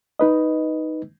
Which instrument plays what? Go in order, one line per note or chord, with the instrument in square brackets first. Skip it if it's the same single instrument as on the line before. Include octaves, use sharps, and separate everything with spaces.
[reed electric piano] D#4 B4 D#5